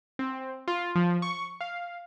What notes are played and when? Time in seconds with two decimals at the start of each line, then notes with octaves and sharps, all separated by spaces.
0.19 C4
0.68 F4
0.95 F3
1.22 C#6
1.61 F5